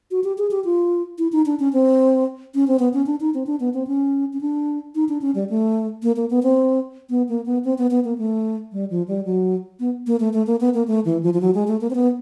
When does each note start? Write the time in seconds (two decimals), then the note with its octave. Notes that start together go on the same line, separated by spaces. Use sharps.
0.11 F#4
0.24 G4
0.38 G#4
0.51 G4
0.65 F4
1.18 E4
1.32 D#4
1.46 D4
1.59 C#4
1.73 C4
2.55 C#4
2.68 C4
2.79 B3
2.93 C#4
3.06 D4
3.20 D#4
3.34 C4
3.47 D4
3.60 B3
3.74 C4
3.87 C#4
4.33 C#4
4.41 D4
4.95 D#4
5.09 D4
5.21 C#4
5.35 G3
5.49 A3
6.03 A#3
6.16 A#3
6.30 B3
6.43 C4
7.10 B3
7.29 A#3
7.46 B3
7.65 C4
7.78 B3
7.91 B3
8.04 A#3
8.18 A3
8.72 G3
8.90 F3
9.08 G3
9.25 F#3
9.80 B3
10.07 A#3
10.20 A3
10.33 A3
10.47 A#3
10.61 B3
10.74 A#3
10.87 A3
11.05 E3
11.23 F3
11.34 F3
11.41 F#3
11.54 G#3
11.67 A3
11.81 A#3
11.90 C4
11.95 B3